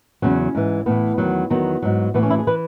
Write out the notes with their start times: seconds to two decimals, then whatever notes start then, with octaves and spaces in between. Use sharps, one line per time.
0.22 E2 C#3 F#3 C#4
0.55 G#2 E3
0.86 A2 E3 B3
1.18 E2 D#3 F#3
1.50 E2 D#3 F#3 B3
1.82 G#2 F#3
2.14 A2 E3 B3
2.23 C#4
2.30 E4
2.39 G#4
2.47 E3 B4